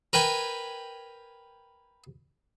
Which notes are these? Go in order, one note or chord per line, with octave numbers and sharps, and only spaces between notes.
A#4 B4 G5 G#5 B5